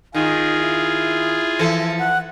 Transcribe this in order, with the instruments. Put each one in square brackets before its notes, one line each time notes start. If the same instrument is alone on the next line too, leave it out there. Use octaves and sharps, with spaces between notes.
[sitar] D#3 [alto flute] D#4 [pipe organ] F4 G#4
[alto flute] E4
[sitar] E3 F3 A4
[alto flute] F#5